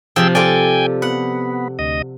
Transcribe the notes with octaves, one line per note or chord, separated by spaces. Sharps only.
C3 F3 G#4 G5 E6
F4 A4 D5 G5 G#5
B3 F#5
D2 D#5